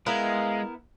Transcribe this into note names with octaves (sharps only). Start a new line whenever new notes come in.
G#3 B3 E4 A#4 F5